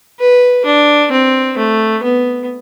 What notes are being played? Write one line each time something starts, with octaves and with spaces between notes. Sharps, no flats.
B4
D4
C4
A3
B3